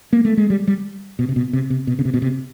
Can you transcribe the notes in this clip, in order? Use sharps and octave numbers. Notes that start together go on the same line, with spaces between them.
A#3
A3
G#3
G3
G3
B2
C3
B2
C3
C3
B2
C#3
C3
B2
C3